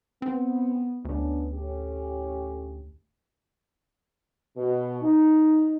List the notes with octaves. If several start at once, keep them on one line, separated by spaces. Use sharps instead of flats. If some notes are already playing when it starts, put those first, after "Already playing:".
B3 C4
D2 B3 C#4 D4
A2 C#4 G4
B2
D#4